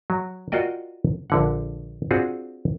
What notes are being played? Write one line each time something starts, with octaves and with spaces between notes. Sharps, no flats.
F#3
F4 F#4 A#4 D5 D#5 G5
A#1 D3 F#5
C4 D4 F4 F#4 G#4